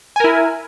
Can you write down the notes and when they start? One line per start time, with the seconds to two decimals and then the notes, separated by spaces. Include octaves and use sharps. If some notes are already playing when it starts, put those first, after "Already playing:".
0.16 G#5
0.20 A#4
0.24 E4